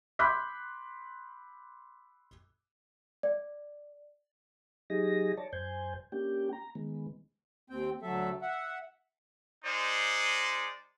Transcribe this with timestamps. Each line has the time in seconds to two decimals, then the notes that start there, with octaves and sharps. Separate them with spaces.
0.19 B5 C6 D6 F#6 G6 B6
3.23 D5
4.90 F#3 D#4 G4 G#4 D#5 A#6
5.37 C#5 D5 A5
5.53 F#2 C5 G#5 G6
6.12 A#3 C#4 D4 G4 G5
6.53 A#5
6.75 D#3 G#3 B3
7.70 D#2 C4 G5
8.02 D2 F#3 A4 E5
8.42 E5 F#5
9.64 G#3 D#4 C5 D5